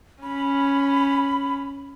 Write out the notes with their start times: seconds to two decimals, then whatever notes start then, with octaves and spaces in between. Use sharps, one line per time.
0.23 C#4 B5